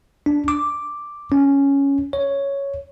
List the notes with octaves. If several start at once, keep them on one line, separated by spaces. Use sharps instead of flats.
D4
D6
C#4
C#5